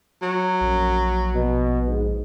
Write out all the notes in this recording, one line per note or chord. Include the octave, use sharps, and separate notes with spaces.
F#3
A#1 F#2
B2
G#2